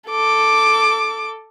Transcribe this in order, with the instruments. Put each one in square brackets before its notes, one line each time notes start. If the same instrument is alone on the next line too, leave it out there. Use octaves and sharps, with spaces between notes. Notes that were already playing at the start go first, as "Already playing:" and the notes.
[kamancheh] A4 D6